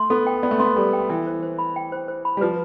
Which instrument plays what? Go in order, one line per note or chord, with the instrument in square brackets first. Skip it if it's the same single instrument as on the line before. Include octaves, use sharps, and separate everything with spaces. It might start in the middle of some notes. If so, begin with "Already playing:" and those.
Already playing: [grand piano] A3 [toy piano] C6
[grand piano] B3 [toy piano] A4
[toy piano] G5
[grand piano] B3 [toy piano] D5
[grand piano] A3
[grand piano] B3 [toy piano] C6
[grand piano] G3 [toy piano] A4
[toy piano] G5
[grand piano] E3 [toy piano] G5
[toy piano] C5
C5
B5
G5
C5
C5
B5
[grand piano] G3
[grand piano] F3 [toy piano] B4